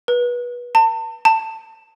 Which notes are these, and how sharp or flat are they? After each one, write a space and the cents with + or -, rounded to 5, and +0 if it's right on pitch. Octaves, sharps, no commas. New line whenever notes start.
B4 -25
A5 +35
A5 +20